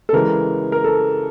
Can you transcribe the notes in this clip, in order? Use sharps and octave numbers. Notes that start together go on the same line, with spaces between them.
A4
C#3 E3 G#3 A#4
A#4
A4